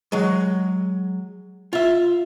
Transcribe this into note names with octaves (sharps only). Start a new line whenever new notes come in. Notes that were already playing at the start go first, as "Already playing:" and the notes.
F#3 G#3
F4 E5